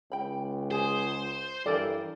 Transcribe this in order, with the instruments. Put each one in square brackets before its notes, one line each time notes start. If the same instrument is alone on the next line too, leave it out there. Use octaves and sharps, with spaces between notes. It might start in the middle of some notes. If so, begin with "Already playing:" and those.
[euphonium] C#2 [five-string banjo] G5 B5
[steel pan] G#4 [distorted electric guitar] C5
[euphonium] G2 [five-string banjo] E3 A4 A#4 [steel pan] D5